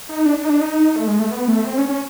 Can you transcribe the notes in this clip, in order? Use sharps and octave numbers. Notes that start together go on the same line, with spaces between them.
D#4
D4
D4
D#4
D4
D#4
A3
G#3
A3
B3
A3
C4
C#4
C#4